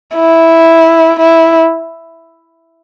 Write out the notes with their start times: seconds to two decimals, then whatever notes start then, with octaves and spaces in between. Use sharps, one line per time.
0.15 E4
1.20 E4